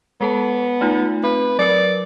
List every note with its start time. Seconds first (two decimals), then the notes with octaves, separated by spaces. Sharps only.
0.21 G#3 B3 A4 A5
0.81 A3 D#4 F4
1.24 C4 B4
1.59 F#3 A#4 B4 D5